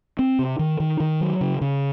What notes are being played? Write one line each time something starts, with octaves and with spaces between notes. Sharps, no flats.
C4
C3
D#3
D#3
D#3
F#3
C#3
C#3